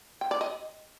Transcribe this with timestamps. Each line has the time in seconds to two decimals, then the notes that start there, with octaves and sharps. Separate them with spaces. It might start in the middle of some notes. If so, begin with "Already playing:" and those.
0.21 G5
0.31 D5
0.41 D#5